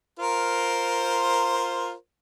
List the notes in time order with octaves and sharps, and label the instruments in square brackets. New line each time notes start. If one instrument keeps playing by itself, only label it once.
[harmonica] F4 A#4 C5